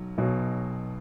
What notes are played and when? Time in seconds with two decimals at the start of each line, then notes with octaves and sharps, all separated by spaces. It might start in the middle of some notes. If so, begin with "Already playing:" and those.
Already playing: B1 F#3
0.18 B1 B2 F#3